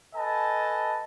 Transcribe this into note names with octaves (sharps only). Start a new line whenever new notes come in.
A4 B4 D#5 G#5 A5